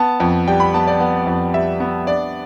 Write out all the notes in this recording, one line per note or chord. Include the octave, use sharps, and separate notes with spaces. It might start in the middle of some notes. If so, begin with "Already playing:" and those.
Already playing: B3 A5
F2
G3 G5
B5
B3 A5
D5
B3
F2
G3 E5
B3
D4 D5